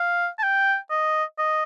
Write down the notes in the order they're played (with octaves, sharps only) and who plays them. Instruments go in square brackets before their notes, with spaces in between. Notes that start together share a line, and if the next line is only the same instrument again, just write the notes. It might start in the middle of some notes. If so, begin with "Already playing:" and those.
Already playing: [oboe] F5
A5
G5
D#5
D#5